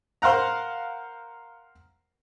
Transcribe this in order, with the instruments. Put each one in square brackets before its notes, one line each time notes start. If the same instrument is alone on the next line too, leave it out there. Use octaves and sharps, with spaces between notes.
[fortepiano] A#4 C5 F5 F#5 A#5